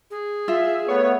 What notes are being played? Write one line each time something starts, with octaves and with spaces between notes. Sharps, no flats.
G#4
F4 E5
A3 B3 C#5